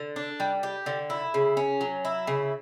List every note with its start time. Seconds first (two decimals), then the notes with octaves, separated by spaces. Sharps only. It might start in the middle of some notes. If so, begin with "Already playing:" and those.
Already playing: D3
0.16 D4
0.40 G3
0.63 G4
0.86 D3
1.10 E4
1.34 C#3
1.57 C#4
1.81 F#3
2.05 E4
2.27 C#3